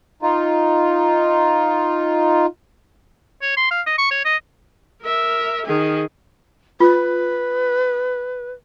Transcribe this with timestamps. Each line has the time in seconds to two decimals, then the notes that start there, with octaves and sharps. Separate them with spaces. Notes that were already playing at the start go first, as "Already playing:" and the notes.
0.22 D#4 F4
3.42 C#5
3.57 C6
3.71 F5
3.86 D#5
3.98 C#6
4.11 C#5
4.25 D#5
5.02 A#4 E5
5.65 D#3 G#4
6.80 F4 B4